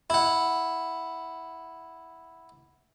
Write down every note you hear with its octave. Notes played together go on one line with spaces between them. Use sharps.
E4 F#5